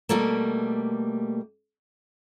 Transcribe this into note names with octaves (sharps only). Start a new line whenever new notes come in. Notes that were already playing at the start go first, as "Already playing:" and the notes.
B2 G3 A3 A#3